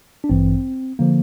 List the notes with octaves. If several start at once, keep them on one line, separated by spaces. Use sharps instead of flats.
D4
A1 G2 E3 C4
D3 F3 A#3